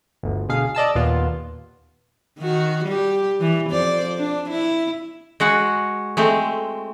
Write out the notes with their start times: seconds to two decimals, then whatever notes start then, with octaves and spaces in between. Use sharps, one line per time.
0.23 G1 D2
0.49 B2 D3 G#4 F5
0.75 D5 D#5 A5 E6
0.95 D#2 A#2 B3 F4
2.38 D#3 F#4
2.85 G3 G4
3.41 E3
3.70 F2 C5 D5
4.18 D4
4.50 E4
5.40 G#3 F#4 F#5
6.17 G#3 A3 C4